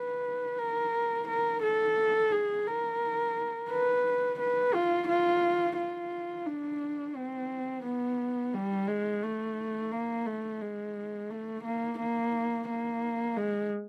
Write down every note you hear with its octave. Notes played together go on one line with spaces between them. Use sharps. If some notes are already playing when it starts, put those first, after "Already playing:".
Already playing: B4
A#4
A#4
A4
G#4
A#4
B4
B4
F4
F4
F4
D4
C4
B3
G3
G#3
A3
A#3
A3
G#3
A3
A#3
A#3
A#3
G#3